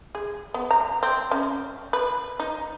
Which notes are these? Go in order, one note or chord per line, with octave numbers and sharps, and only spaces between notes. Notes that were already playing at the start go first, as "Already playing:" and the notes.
G#4
B3
A#5
C4
C#4
B4
D#4